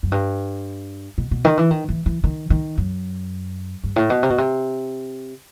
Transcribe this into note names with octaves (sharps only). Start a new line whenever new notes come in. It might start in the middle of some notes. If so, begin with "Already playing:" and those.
F#2
G2
B2
B2
D#3
E3
D#3
E3
E3
D#3
D#3
F#2
G2
A2
B2
C3
B2
C3